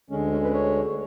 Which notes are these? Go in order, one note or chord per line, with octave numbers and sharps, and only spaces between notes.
D2 D3 G#3 C#4
C#4
B4
C#5